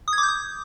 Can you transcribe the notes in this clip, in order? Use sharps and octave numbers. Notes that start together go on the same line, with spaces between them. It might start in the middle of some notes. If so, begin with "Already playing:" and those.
D#6
G#6
D6
G6
D#6